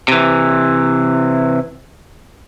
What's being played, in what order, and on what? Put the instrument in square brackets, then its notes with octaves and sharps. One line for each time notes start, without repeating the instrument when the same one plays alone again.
[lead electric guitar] C3 E3